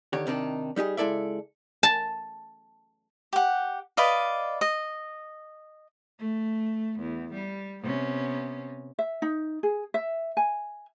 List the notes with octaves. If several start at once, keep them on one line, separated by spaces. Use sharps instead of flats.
D3 D#3 G4 C#5
C3 D#3 D4 D#4
G3 D#4 G4 G#4
C#2 G#3 E4 A4 D5 E5
A5
G4 F#5
B4 D5 D#5 F5
D#5
A3
E2
G3
C3 B3 C#4
E5
D#4
G#4
E5
G#5